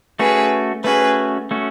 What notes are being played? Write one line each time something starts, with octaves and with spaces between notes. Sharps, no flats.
A3 C#4 F#4 G#4 B4
A3 C#4 F#4 G#4 B4
A3 C#4 F#4